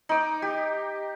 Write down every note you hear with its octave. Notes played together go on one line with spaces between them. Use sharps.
D#4 D6
G4